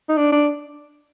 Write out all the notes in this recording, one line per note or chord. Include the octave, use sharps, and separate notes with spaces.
D#4
D4
D4